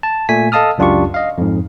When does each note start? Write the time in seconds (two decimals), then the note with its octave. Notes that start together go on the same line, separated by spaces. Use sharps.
0.03 A5
0.29 A#2 A3 G#5 B6
0.52 A4 D#5 F5 A5 D#6 F6
0.78 C#2 F#2 D4 F4 G4 C#6
1.14 D#5 F5
1.38 F2 G#2